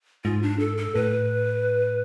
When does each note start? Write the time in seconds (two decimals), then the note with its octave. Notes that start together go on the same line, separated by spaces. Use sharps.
0.24 G#2 F4
0.42 D4
0.59 A4
0.78 A4
0.95 A2 B4